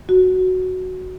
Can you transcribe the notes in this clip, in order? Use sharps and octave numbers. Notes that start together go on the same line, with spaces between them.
F#4